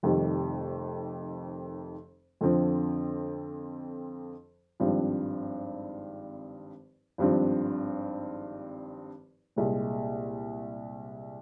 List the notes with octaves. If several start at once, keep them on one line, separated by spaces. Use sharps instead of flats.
F1 F2 D#3 G3
F2 D3 F3 C4
G#1 G2 F3 C4
G#1 G2 F3 C4
C2 A#2 G#3